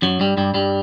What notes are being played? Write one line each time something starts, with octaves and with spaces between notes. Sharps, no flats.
F#2 F#3
G2 G3
G2 G3
G2 G3